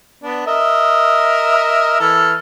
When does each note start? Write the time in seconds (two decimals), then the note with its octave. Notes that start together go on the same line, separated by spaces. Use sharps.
0.23 B3 D4
0.47 A#4 D#5 E5
2.00 E3 A4 F6